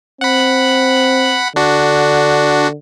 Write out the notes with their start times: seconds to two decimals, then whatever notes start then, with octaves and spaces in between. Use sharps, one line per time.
0.21 C4 F#5 B5
1.56 D3 D4 F#4